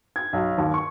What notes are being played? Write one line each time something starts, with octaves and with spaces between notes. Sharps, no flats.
G#6
B1
D#2
C#6